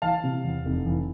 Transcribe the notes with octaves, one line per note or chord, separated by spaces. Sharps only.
E3 F5 A5
C3
E2
F1
E3